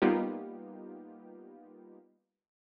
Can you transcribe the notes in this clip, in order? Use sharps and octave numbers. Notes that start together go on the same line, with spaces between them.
G3 A#3 B3 D#4 F4 G4